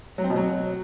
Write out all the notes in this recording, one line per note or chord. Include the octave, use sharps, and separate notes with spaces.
F#3
C4
B2
F#3